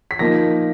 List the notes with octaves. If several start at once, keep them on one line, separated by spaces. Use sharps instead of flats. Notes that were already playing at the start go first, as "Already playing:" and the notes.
B6
F3 A#3 D#4 A#6